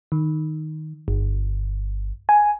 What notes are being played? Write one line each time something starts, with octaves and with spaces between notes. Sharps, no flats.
D#3
G1
G#5